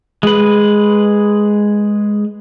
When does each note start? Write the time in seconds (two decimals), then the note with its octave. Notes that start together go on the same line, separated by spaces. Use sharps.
0.23 G#3 B4